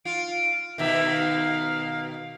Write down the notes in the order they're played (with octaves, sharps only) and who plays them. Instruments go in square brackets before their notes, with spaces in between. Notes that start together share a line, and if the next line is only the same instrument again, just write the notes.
[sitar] F4 [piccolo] D7
[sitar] B2 D#3 [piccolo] E5
[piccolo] F5